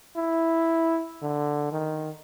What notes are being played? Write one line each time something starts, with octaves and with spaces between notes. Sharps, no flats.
E4
D3
D#3